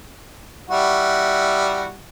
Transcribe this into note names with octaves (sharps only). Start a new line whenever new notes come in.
G3 E4 F#4